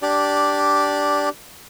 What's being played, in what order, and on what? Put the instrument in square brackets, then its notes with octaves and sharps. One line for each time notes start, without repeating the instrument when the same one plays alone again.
[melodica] D4 G4 D5